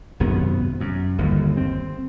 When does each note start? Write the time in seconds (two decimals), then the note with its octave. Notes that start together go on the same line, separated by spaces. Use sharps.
0.20 G#1 F#2 C3 B3
0.80 F#2
1.18 G1 D#2
1.57 C4